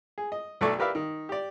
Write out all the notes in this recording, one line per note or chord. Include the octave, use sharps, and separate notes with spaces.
G#4
D#5
B1 F#3 A3 A4 D5 C#6
G4 A#4 B4 D5 E5 F5
D#3
G4 D5